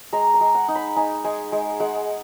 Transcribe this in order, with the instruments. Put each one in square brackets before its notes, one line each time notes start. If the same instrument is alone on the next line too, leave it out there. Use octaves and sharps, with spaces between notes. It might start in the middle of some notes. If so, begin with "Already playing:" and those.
[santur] G#3 A#5
A#5
G#3
F#5
D#4
B5
D#4 G#5
G#3 G#5
G#3
G#3 F#5